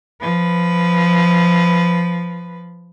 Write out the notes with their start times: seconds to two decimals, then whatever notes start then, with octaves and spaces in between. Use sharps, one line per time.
0.21 F3 B4